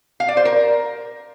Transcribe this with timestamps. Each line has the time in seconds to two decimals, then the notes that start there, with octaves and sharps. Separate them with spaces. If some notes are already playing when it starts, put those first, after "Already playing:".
0.20 F5
0.28 D5
0.37 C5
0.45 A#4